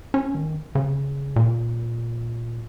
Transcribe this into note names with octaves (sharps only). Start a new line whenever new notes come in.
C#4
D#3
C#3
A#2